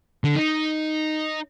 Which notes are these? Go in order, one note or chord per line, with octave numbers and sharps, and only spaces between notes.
D3
D#4